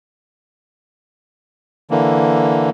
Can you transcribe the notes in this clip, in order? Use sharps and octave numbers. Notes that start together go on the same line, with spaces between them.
D3 E3 A#3